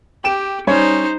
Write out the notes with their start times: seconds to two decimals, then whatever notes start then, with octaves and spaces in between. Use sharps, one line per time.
0.24 G4 G5 D7 E7
0.67 G3 C#4 D#4 C5 C#5